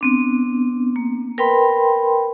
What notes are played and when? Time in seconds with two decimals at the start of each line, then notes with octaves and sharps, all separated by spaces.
0.01 B3 C4 D4
0.96 A#3
1.38 A#4 B4 G5 B5 C6